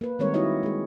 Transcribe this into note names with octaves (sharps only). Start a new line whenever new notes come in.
A#3 B4
D#3 G3 G#3 C4 A#4 C#5
D#4 E4 F#4 C#5 D#5
G#3 G#4